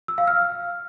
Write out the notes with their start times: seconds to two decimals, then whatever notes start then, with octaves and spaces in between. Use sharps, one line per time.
0.08 E6
0.18 F5
0.27 F6